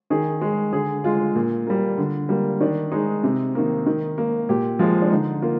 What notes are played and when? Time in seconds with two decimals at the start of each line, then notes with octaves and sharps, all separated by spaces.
0.10 D#3 G#4
0.41 G#3
0.73 D3 G#4
1.04 G#3 F4
1.36 A#2
1.67 G3 A#3
1.98 D3
2.29 G3 A#3
2.60 D#3 D4
2.92 G#3 D#4
3.23 C3
3.55 D#3 A#3
3.86 D#3
4.18 A#3
4.49 A#2 G4
4.79 F3 G#3 F4
5.02 D4
5.11 D3 D#4
5.42 A#3 F4